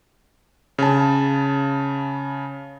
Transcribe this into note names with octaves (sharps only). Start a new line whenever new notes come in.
C#3 A5